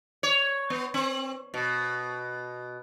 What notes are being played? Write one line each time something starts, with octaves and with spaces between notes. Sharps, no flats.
C#5
B3
C4
B2